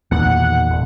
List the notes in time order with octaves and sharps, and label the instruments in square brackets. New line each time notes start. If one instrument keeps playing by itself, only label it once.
[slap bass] B1 A#2 B3 [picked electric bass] E2 D#3 [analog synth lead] F#5
[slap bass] D#1